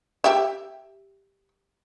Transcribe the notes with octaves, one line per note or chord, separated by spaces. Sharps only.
G4 E5